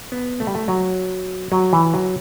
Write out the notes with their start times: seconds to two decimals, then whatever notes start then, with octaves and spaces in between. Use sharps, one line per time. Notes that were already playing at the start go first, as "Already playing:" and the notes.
0.12 B3
0.40 A3
0.47 G3
0.55 A3
0.68 F#3
1.52 F#3
1.73 E3
1.94 F#3